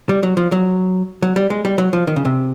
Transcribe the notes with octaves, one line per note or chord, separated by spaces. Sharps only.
G3
F#3
F3
F#3
F#3
G3
G#3
G3
F#3
F3
D#3
C#3
C3